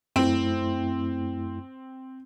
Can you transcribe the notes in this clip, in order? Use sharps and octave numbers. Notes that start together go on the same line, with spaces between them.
F#2 A3 C4 E4